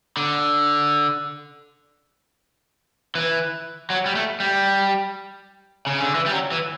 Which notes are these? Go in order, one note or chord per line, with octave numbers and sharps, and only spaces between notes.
D3
E3
F#3
G3
A3
G3
C#3
D3
E3
G3
F#3
E3